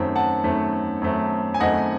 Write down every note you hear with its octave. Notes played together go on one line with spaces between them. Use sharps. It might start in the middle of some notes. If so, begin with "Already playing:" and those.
Already playing: F#2 D#3 A3 C4
F#5 A5
F#2 D#3 A3 C4
F#2 D#3 A3 C4
G#5
F#2 D#3 A3 C4 D#5 F#5